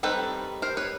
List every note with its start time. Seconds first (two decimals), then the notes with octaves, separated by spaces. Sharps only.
0.03 D#3 G3 C4 A4 B4
0.62 A#4 C5
0.77 B4 C#5